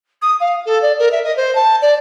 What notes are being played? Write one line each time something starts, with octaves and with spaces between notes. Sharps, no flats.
D#6
F5
A4
D5
A#4
E5
D#5
C5
A5
D5